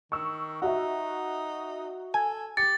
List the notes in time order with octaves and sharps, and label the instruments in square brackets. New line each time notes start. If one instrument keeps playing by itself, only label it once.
[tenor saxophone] D#3 [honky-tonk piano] C#6 E6
[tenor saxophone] D#4 [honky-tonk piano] F#4 E5
[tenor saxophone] A4 [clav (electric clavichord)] G#5
[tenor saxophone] G4 [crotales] A6 [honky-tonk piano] C#7